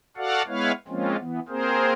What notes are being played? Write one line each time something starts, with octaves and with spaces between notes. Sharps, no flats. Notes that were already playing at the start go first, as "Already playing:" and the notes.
F#4 A4 D5 F5 F#5
G#3 B3 E4 B4 C#5 F5
F3 G#3 A#3 C4 C#4 F4
E3 B3
A#3 C4 G#4 A#4 C5